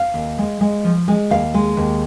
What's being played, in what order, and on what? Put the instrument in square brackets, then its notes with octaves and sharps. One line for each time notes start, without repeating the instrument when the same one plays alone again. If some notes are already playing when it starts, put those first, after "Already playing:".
Already playing: [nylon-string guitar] F5
D#2
G#3
G#3
F3
G#3
D#2 F5
G#3
D#2